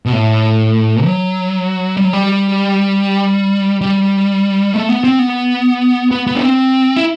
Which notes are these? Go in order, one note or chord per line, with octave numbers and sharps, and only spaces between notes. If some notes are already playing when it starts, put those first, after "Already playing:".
B2
A2
F#3
G3
F#3
G3
G3
A3
B3
C4
B3
B3
B3
D4
C4
E4